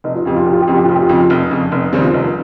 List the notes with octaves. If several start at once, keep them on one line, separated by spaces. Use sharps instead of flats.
F1 D#4
F4
F2 C#3 G4
F4
F1 G4
F4
G4
F2 C#3 F4
G4
F4
F1 G4
F4
F2 C#3
F1
F2 C#3
F1
D#2 C#3 G3 C4
F4
F1 D#4